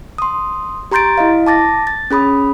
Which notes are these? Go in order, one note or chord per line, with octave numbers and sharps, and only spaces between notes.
C6 D#6
G4 A#5 C6 G6 A6 D7
E4 D#5 F5
A5 D6 A6 A#6
A6
C#4 G#4 B5 D#6